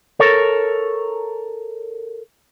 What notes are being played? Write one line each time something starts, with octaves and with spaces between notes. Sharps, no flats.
A4 A#4 C#5